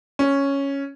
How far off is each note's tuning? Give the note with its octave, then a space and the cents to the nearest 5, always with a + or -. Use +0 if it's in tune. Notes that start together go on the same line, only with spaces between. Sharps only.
C#4 +0